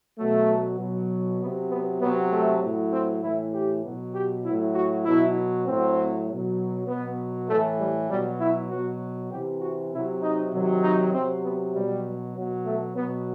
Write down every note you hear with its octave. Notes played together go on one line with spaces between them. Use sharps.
B2 F#3 A3
B2 F#3
C3 F#3 B3
B3
C3 F#3 B3
A3
A2 F#3
C4
A2 E3 E4
G4
B2 F#3
G4
A2 F#3 E4
F#4
B2 F#3 E4
A2 F#3 C4
B2 F#3
B2 F#3 B3
A2 E3 A3
G3
B2 F#3 G3
E4
B2 F#3 F#4
C3 E3 G4
F#4
C3 F#3 E4
D#4
C3 D#3 F#3
D#4
C3 F#3 C4
B3
B2 F#3 G3
B2 F#3
A3
B2 F#3 B3